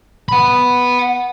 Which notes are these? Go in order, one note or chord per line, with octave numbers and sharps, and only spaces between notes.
F#5 B5